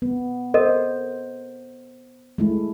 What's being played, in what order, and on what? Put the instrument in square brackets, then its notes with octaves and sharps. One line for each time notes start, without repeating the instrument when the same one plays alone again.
[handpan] B3
[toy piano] A4 A#4 D#5 [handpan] C5
[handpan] G#3 A3 E4